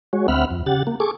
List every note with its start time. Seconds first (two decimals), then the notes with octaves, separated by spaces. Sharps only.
0.13 G#3 F#4 C#5
0.28 D2 C4 E5 F#5 B5 F6
0.51 F2
0.66 C#3 G4 F#5 A6
0.87 A#3
1.00 G#4 A4 C#6 D6